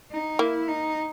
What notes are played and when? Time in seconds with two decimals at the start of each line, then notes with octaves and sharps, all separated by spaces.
0.11 D#4
0.39 A#3 E4
0.67 D#4